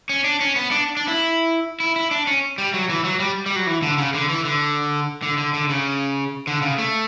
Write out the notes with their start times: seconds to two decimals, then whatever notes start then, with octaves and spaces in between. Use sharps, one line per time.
0.09 C#4
0.24 D4
0.41 C#4
0.56 B3
0.71 D4
0.97 D4
1.08 E4
1.80 E4
1.96 E4
2.11 D4
2.27 C#4
2.58 G3
2.74 F#3
2.89 E3
3.04 F#3
3.20 G3
3.46 G3
3.56 F#3
3.67 E3
3.82 D3
3.98 C#3
4.14 D3
4.29 E3
4.45 D3
5.22 D3
5.38 D3
5.53 D3
5.69 C#3
6.47 D3
6.62 C#3
6.78 A3